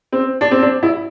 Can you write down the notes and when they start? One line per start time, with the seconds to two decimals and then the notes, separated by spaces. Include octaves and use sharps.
0.12 C4
0.41 D4
0.51 C4
0.62 D4
0.83 E4